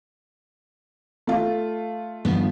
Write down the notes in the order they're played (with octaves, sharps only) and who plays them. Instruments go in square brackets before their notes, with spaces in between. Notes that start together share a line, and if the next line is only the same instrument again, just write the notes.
[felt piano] A3 F4
[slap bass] G2 D#3 F3 [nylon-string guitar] B3